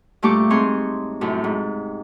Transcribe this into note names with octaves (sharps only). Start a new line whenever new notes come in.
G2 A#2 A3 G4 C#6 D6
G#2 C4 G#4 C#5 C6
F#2 A2 C3
G#2